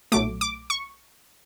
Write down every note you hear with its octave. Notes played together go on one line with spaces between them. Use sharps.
B1 A#2 F#3 A3 D6
D6
C#6